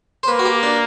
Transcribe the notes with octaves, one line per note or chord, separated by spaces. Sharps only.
C5
A#3 B4
F#4
G4
D4